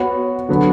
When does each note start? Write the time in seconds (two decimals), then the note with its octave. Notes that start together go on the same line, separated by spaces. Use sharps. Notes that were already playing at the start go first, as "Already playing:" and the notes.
Already playing: B3 F#4 C#5
0.49 D3 F#3 B3